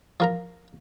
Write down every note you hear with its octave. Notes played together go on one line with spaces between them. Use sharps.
F3 A#4 A#5